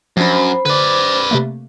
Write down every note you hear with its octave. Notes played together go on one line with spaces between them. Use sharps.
F#2 F3 D4 C5 B5
D3 B4 D5
C3 A3 A#3